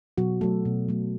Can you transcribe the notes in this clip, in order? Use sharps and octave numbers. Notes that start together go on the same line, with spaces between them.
B2 F#3 F#4
F#3 A3 A4
B2
F#3 A3